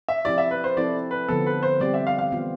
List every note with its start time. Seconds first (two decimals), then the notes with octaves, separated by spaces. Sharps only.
0.08 E5
0.25 F3 C4 E4 G4 D5
0.38 E5
0.51 B4
0.64 C5
0.77 F3 C4 E4 A4 D5
1.11 B4
1.28 D3 F3 B3 A4
1.46 B4
1.63 C5
1.80 G3 C4 G4 D5
1.94 E5
2.07 F5
2.19 F5
2.32 E3 B3 F4